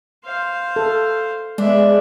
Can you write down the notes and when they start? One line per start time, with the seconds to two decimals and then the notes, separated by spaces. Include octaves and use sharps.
0.25 C5 F5
0.76 A4
1.58 G#3 B3 D4 E5